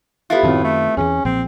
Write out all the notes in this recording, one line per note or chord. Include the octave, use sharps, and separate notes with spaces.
B3 E4 F4 G4 A4 E5
F#2 A2 D#3 C4 F#4
A3
E2 D#3 E3 C#4 G#4
B1 A#2 F3 C4